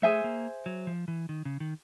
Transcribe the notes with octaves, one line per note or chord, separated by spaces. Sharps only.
A3 G#4 C5 E5 G#5
A#3
F#3
F3
E3
D#3
C#3
D#3